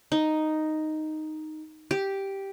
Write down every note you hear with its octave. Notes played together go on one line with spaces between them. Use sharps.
D#4
G4